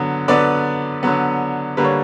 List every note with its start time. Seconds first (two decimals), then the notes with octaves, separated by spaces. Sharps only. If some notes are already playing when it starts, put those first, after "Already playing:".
Already playing: D3 F#3 B3
0.28 D3 F#3 B3 B4 D5
1.03 D3 F#3 B3
1.77 D3 G3 A#3 B4
1.84 C#5